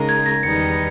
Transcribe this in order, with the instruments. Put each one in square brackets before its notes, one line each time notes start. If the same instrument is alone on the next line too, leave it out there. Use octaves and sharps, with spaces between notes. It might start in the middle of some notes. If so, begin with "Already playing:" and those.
Already playing: [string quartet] C#3 G#3 D#4 A#4
[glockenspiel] G#6
A#6
[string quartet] E2 D#3 G3 B3 D#4 [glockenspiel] C#7